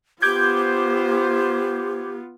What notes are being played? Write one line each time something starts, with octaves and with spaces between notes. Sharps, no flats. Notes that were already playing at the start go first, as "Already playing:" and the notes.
B3 F4 G4 C5 D6 G6 G#6